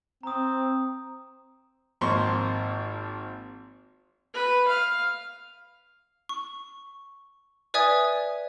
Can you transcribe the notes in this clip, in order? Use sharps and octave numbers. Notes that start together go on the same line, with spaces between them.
C4 A#5 D#6
G#1 F3 A#3 C6 C#6
B4
F5
C#6
B4 D5 E5 G#5 D#6 G#6